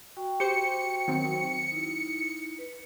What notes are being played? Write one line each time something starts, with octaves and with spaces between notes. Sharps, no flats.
F#4 G5 C#6
G4 C5 C#7
D#3 F#3 C4
D#4 E4
B4